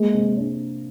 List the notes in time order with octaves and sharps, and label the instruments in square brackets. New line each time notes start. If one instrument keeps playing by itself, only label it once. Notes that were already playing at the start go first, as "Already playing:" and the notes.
Already playing: [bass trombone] G#3 [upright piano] A#3
[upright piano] C3
D4